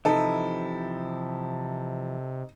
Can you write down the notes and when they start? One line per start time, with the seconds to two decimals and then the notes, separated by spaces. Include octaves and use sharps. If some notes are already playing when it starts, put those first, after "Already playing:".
0.05 C3 E3 F3 D#4 E4 A4